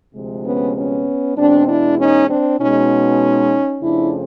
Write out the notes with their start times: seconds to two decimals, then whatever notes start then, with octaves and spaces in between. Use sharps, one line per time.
0.14 D2 C3 F3 G#3
0.45 B3 C#4
0.76 B3 C#4
1.37 E2 B2 G#3 C4 D4
1.68 D4 E4
1.99 C#4 D#4
2.29 C4 D4
2.60 B2 G#3 C#4 D#4
3.82 F2 C#3 F3 A3 D4 E4